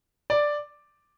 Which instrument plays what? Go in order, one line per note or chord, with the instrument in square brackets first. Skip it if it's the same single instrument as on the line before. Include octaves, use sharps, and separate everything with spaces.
[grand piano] D5